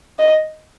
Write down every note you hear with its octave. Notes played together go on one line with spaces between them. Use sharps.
D#5